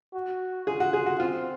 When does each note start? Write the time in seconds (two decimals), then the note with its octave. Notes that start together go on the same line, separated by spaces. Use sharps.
0.14 F#4
0.67 F4 G#4
0.80 F#4
0.93 G#4
1.06 F#4
1.19 C4 F4